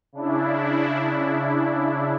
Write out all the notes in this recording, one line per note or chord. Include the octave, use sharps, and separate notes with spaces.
C#3 D4 E4